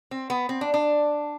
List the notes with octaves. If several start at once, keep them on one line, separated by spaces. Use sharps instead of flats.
C4
B3
C4
D4
D4